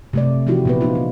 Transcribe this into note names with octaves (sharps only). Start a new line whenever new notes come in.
C3 A3 D5
E3 F3 D#4 E4 F#4 G4
A#2 B3 B4
B3 D#4 F4
D4